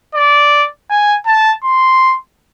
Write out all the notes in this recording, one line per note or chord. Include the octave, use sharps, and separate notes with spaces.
D5
G#5
A5
C6